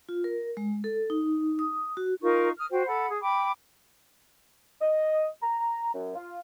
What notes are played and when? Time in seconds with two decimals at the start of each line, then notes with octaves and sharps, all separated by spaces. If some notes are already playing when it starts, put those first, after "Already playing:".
0.09 F4
0.24 A#4
0.57 G#3
0.84 A4
1.10 D#4
1.59 D#6
1.97 F#4
2.22 D#4 F4 A#4 C#6
2.58 D#6 F6
2.72 F#4 C5 G5
2.87 A4 F#5 B5
3.09 G#4
3.22 G5 B5 D6
4.81 D#5
5.42 A#5
5.94 F#2
6.15 F4